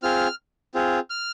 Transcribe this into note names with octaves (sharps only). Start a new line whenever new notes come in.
C4 F4 G#4 F6
C4 F4 G#4
F6